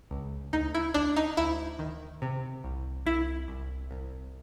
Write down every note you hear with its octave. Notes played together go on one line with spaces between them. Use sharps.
C#2
D2 D#4
E4
D2 D4
D#4
D2 E4
D#3
C3
C2
C2 E4
C2
C2